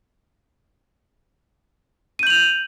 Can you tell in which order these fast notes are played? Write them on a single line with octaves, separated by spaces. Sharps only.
D#7 G6 F#7 F7